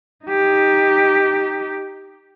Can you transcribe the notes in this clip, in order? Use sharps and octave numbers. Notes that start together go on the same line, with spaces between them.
D#4 G4